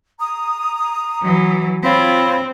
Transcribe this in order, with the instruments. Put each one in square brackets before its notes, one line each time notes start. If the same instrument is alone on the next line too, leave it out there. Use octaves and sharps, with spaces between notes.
[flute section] A#5 D#6
[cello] E3 F#3
[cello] C4 [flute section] F4 C#5 B5